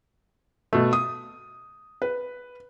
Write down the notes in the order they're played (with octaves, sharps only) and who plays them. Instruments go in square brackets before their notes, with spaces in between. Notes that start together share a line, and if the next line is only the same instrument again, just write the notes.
[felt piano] B2 A3
D#6
B4